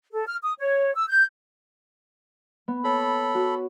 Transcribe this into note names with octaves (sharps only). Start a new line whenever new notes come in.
A4
F6
D#6
C#5
E6
G6
B3
A4 C#5 B5
F#4